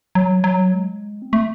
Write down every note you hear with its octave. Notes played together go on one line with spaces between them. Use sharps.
F#3
F#3
G#3
C4
A3